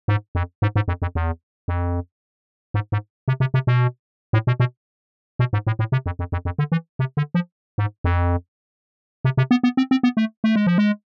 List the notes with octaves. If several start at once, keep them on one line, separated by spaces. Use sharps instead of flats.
G#2
F2
G#2
G#2
F2
F2
E2
F2
G#2
G#2
C3
C3
C3
B2
A2
B2
B2
B2
G#2
A2
A2
C3
F2
F2
F2
F2
D3
E3
C3
D3
F3
G#2
F2
C3
C3
B3
B3
C4
C4
B3
A3
A3
G#3
F3
G#3